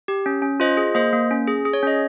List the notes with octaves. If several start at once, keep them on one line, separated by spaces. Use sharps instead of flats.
G4
C#4
C#4
F4 C5 D#5
G#4
A#3 C5 D#5
A#3
C#4
G#4
G#4
C#5
C#4 D#5